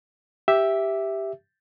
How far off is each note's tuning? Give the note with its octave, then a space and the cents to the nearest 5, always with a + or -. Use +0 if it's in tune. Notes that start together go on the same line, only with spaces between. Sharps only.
G4 +0 E5 +0